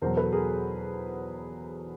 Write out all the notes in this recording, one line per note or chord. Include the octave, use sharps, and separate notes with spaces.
E2 B2 F#3 A#4 C5
A4 B4
G#4 A#4